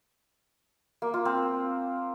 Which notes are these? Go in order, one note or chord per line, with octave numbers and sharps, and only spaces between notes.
A#3
F4
C4